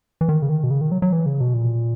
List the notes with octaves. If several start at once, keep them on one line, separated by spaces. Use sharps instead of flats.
E3
D#3
C#3
D#3
B2
C#3
D#3
F#3
F#3
E3
C#3
B2
A#2